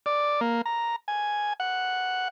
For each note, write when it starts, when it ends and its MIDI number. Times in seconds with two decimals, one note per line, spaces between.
0.06 0.41 74
0.41 0.61 58
0.66 0.96 82
1.08 1.53 80
1.60 2.28 78